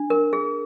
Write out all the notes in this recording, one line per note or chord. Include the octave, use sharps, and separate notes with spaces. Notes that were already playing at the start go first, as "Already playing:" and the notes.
Already playing: D4
A#4
G#4